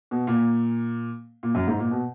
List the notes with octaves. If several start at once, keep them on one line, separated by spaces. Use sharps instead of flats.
B2
A#2
A#2
F#2
G#2
A#2
B2